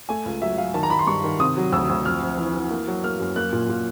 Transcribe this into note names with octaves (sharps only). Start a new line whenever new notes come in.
A3 G#5
C#2
F#3 E5
F#3 F5
D#3 A5
A#5
D#3 B5
C6
G2 C#6
D#3
C3 D#6
F#3
D2 E6
D2
F2 F6
F2
E3
E3
A#3
F#3
A#3 F6
F#2
A#3 F#6
A#2
A#2